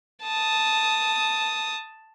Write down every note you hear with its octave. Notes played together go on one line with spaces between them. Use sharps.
A5 D#6